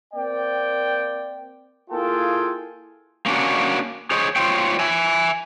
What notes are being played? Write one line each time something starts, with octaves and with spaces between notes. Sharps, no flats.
A#3 C4 D5 G5
A#3 E4 F4 G#4 A4 G5
A#3 C#4 D4 F#4
G#4 C5 C#5 D#5
F4 C5 C#5 G5
E5 G#5